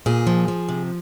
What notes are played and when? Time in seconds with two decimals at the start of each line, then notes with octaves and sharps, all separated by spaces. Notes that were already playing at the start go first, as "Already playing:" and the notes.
0.06 A#2 G#4
0.27 F3
0.48 F3
0.69 C3